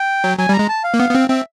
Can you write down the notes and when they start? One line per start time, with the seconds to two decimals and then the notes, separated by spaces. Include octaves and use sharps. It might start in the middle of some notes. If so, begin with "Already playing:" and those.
Already playing: G5
0.24 F#3
0.38 F#3 G#5
0.49 G3
0.54 A#5
0.59 G#3
0.69 A5
0.84 F5
0.94 A#3
1.00 B3
1.10 B3
1.15 C4
1.29 C4 E5